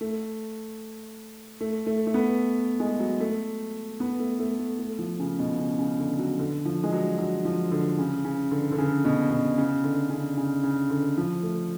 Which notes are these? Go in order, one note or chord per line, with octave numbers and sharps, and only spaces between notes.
A3
A3
A3
A3
B3
G#3
F#3
A3
B3
A3
A3
A3
A3
F3
C#3
B2
C#3
C#3
D3
F#3
D3
F3
G#3
F#3
F#3
F3
D3
C#3
C#3
D3
D3
C#3
B2
B2
C#3
D3
C#3
C#3
C#3
D3
F3
A3